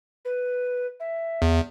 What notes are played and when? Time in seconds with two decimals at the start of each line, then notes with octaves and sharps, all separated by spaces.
0.25 B4
1.00 E5
1.42 E2